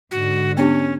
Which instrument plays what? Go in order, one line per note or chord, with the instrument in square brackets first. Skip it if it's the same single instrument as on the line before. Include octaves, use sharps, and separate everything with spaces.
[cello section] G#2 D3 [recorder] F#4
[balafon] B3 D4 G4 [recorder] C#4